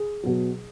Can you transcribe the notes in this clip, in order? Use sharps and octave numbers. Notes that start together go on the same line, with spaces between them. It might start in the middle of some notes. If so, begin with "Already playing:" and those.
Already playing: G#4
B2 F#3